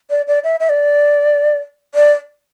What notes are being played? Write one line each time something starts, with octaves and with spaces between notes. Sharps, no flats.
D5
D5
E5
E5
D5
D5